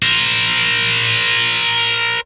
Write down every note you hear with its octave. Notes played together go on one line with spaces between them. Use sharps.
A#4 C5